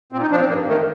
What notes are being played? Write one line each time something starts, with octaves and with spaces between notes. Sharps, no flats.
A#2 C4
D#4
F3 D4
C4
G2 A#3
D#3 A3